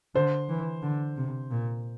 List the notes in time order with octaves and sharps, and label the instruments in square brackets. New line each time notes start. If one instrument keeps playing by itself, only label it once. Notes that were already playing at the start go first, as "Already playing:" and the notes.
[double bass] D3 [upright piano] C5
[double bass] E3
D3
C3
A#2